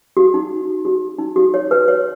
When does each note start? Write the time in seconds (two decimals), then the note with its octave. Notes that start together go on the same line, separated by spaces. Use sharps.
0.17 F#4
0.34 D#4
0.85 F#4
1.18 D#4
1.36 F#4
1.54 C#5
1.71 B4
1.88 C#5